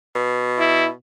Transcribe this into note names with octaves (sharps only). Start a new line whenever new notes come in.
B2
E4